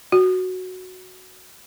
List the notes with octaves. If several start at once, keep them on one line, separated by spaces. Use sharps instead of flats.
F#4